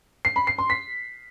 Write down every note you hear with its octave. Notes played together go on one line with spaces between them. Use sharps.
C7
B5
C7
C6
B6